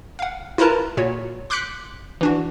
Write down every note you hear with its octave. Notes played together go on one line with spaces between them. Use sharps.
F5 F#5
E4 F4 A#4 B4 A5 A#5
A#2 F#4 C#5
C6 D6 F#6 G6 B6 C#7
E3 D4 F#4